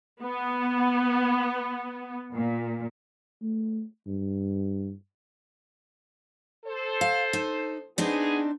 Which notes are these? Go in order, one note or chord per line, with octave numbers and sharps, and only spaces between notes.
B3
A#2
A3
G2
A4 C5
F5
D#4
B3 C4 D4 D#4 G#4